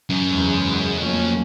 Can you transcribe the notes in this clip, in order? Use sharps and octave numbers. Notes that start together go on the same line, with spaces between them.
F#2
E2 C#3 E3 G#3
F2 A2 F#3 A#3 C#4